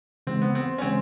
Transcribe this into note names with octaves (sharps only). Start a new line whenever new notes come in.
C#3 E3 G#3 C4
B3
C4
C#4
C#3 E3 G#3 C4